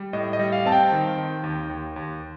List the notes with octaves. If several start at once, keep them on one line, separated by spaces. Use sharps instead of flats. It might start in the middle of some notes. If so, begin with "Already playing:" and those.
Already playing: G3
A2 D#5
D#5
G3
F5
C4 A5
G5
D#3
D#3
D#2
D#2
D#2